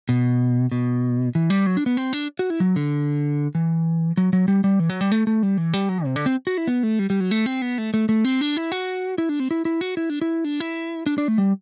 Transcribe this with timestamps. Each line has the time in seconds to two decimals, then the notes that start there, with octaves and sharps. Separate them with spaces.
0.09 B2
0.71 B2
1.35 E3
1.50 G3
1.66 F#3
1.77 D4
1.86 B3
1.97 C4
2.13 D4
2.39 F#4
2.50 E4
2.60 F#3
2.76 D3
3.55 E3
4.17 F#3
4.33 F#3
4.48 G3
4.64 G3
4.79 E3
4.90 F#3
5.01 G3
5.12 A3
5.27 A3
5.43 G3
5.57 E3
5.74 G3
5.89 F#3
6.05 C3
6.16 D3
6.26 C4
6.47 F#4
6.57 E4
6.67 B3
6.83 A3
6.99 G3
7.10 G3
7.20 F#3
7.31 A3
7.46 C4
7.62 B3
7.78 A3
7.94 A3
8.09 A3
8.25 C4
8.41 D4
8.57 E4
8.72 F#4
9.18 E4
9.29 D4
9.40 C4
9.51 E4
9.65 E4
9.81 F#4
9.97 E4
10.10 D4
10.21 E4
10.44 D4
10.60 E4
11.06 D4
11.18 D4
11.28 A3
11.38 G3